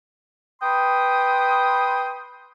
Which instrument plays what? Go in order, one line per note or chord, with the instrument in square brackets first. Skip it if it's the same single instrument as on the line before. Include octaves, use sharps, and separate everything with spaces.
[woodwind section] B4 G5 C6 D#6